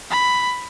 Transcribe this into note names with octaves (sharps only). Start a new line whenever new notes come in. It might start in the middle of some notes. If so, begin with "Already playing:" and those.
B5